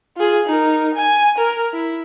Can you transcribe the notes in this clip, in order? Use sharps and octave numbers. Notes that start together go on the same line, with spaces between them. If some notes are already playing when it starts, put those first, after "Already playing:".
F4 G#4
D#4 A#4
G#5
A#4
E4